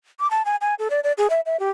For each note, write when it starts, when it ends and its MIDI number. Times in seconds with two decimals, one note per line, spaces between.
0.19 0.29 86
0.30 0.45 81
0.45 0.56 80
0.61 0.74 80
0.79 0.88 69
0.90 1.00 74
1.04 1.12 74
1.18 1.30 68
1.30 1.40 76
1.46 1.59 76
1.59 1.70 67